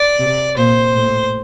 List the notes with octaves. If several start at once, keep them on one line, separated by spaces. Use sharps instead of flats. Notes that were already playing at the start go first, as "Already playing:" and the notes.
Already playing: D5
C3
A#2 C5
A2